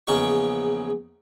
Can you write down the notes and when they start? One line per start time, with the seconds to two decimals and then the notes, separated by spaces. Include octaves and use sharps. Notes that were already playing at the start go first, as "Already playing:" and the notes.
0.07 A#1 E2 C#3 C#4 D#4 C#6